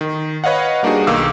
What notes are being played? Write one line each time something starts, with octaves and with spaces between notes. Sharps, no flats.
D#3
B4 C#5 D#5 F5 F#5
G3 A#3 D4 D#4 F#4 G#4
B1 D#3 A#3 F5 D6 E6